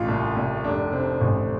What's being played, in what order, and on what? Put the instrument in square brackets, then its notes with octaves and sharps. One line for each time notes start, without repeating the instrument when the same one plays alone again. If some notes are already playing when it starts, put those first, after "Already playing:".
Already playing: [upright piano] A1 F4
C2
C2
F1 D4
F1 C4
A1